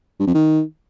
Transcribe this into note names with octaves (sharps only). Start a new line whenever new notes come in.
G2
F2
D#3